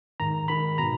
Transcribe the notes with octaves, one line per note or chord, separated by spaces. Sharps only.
G#2 D#3 A#5
G#2 D#3 B5
B2 A#5